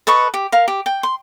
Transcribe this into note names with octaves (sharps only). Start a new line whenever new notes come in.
A4 B4 D#5 C#6
G4
A#4 F5
G4
G5
C6